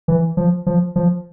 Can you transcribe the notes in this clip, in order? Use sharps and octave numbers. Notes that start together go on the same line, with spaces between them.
E3
F3
F3
F3